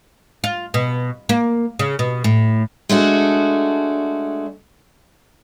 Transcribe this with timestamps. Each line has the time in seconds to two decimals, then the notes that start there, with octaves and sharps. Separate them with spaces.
0.44 F4
0.74 B2
1.29 A#3
1.79 C#3
1.99 B2
2.24 A2
2.89 G#3 A3 D4 F#4